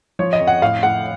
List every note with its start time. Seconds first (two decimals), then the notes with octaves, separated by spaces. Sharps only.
0.19 F3 C#5
0.33 D#5
0.40 F2
0.47 F#5
0.62 A2 F5
0.83 A2 F#5